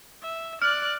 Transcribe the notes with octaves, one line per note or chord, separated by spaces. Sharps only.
E5
D5 F6 F#6